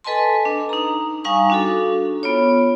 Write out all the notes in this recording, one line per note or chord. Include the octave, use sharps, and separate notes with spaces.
A4 B4 D#5 G#5 A5 C6
D4
D#4 A#5
G3 D#4 F5 G#5 A#5 C#6
D4 F#4 A4
B3 F4 C#5